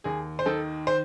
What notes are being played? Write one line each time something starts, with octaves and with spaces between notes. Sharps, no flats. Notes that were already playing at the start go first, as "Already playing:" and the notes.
D#2 G#4
C5
D#3 A4
C5